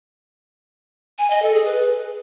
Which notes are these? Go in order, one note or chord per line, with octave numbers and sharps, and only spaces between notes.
G#5
D#5
A4
G#4
B4